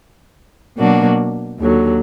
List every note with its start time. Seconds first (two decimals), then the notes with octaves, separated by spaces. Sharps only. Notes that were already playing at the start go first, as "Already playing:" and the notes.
0.77 B2 F#3 A#3 D4 F#4
1.60 D#2 D3 F#3